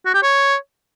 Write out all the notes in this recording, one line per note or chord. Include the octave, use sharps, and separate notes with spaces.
F#4
G4
C#5